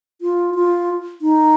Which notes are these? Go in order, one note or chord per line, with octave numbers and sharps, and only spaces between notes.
F4
F4
D#4